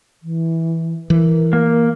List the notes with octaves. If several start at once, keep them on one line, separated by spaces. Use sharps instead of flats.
E3
E3 A#4
A#3